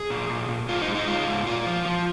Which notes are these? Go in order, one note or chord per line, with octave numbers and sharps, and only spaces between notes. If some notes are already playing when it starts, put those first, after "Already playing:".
Already playing: G#4
A#2
A#2
A#2
G#2 F4
D#4
G#3
D#4
G#3 F4
G#2
A#2 F4
F3
F3